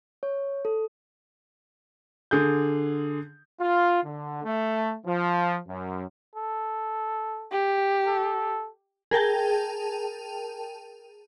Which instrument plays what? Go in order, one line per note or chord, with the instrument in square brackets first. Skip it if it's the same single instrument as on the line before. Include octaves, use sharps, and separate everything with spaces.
[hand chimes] C#5
A4
[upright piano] D3 G#4 G6
[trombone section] F4
D3
A3
F3
F#2
[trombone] A4
[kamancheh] G4
[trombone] A4
[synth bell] G#4 A#4 G5 A5